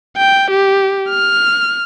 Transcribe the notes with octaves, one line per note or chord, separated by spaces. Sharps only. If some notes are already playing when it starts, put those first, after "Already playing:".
G5
G4
F6